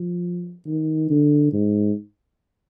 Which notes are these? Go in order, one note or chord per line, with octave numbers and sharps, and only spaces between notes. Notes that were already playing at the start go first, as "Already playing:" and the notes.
Already playing: F3
D#3
D3
G#2